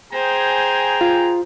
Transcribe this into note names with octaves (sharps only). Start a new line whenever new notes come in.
G#4 C5 G5 G#5 A#5
F4